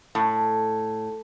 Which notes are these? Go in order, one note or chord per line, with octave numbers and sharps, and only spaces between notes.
A2